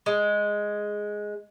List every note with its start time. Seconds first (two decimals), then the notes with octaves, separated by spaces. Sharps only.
0.06 G#3